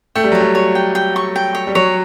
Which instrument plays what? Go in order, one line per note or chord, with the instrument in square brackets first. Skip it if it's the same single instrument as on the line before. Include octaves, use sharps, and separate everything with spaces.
[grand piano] A3 [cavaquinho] G5
[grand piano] G3
[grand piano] F#3 [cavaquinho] C#5
[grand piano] G3
[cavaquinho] C#5
G5
G5
C#6
G5
C#5
[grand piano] G3
[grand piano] F#3 [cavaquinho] C#5